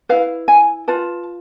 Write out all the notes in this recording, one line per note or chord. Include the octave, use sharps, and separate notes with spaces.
E4 B4 F5
G#5
F4 B4 A5